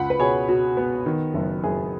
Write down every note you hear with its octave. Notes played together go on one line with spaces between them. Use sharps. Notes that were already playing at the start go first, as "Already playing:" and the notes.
Already playing: C#2 F#5 B5
B4
B2 G#4 C#5
B2 F#4
B3
D#3
F#1
F#1 G#4